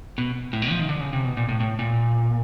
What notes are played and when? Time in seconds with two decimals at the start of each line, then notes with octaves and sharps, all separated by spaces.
0.18 B2
0.53 A2
0.62 B2
0.71 F3
0.79 D#3
0.89 D3
1.01 C#3
1.13 C3
1.25 B2
1.37 A#2
1.49 A2
1.60 A2
1.79 A#2